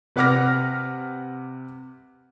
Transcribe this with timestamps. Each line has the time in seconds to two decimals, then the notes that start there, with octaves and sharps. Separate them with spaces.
0.16 C3 B4 F#5 D6 F6 A#6